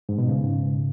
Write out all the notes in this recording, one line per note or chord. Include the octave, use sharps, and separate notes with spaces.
G#2
B2
G#2 C#3